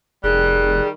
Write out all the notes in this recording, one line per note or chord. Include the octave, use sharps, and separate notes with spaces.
F1 D#3 G3 G#4 F#6